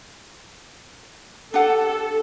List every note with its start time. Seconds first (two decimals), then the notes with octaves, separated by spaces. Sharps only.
1.54 D4 G4 A4 F#5